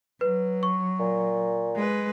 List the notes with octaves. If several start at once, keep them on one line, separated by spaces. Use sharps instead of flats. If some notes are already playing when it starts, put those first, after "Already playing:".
F#3 B4
C#6
A#2
G#3 B4